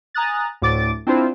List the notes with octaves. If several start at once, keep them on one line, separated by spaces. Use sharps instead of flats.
G#5 A#5 D#6 F#6 A6
D2 A2 D6 A6 D7
C4 D4 E4 F4 C5